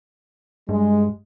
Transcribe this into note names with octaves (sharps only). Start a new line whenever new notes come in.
G2 G#3